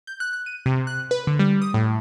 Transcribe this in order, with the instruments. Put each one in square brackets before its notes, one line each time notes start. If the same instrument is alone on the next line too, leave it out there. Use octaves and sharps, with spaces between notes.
[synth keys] G6
F#6
F#6
D#7
C3
F#6
B4
D3
G3
D#6
A2